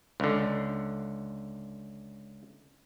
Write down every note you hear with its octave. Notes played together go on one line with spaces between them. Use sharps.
C#2 D3